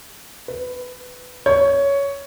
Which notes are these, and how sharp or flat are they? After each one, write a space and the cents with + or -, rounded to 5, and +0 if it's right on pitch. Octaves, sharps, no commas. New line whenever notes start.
B4 +15
C#5 +10